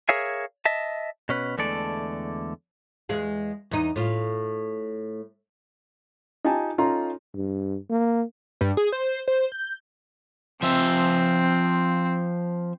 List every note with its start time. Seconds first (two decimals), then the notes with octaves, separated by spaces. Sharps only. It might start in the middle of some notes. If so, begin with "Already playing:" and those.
0.09 G#4 A#4 C#5 E5 F5 G#5
0.65 D#5 E5 A5
1.29 B2 C#4 B4
1.58 E2 D3 G#3 A3 A4 D5
3.09 E2 G#3 F5
3.71 E2 D#4
3.96 A2 F4
6.44 D#4 F4 G4 G#5 A5
6.78 C#4 D#4 F4 A4 A#5 C6
7.34 G2
7.90 A#3
8.61 G2
8.77 G#4
8.92 C5
9.28 C5
9.52 G6
10.63 F3 C4 E5